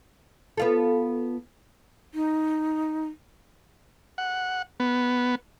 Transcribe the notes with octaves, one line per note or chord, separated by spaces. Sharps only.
B3 F4 A4
D#4
F#5
B3